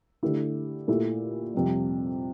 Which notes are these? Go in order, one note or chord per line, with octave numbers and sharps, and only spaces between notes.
D3 A3 E4 G4
A#2 A3 E4 G4
F2 C3 G3